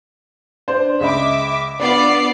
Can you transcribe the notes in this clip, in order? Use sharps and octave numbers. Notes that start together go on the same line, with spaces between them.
D4 C5
C#2 D#5 E5 B5 D6
B3 D4 F4 D5 C7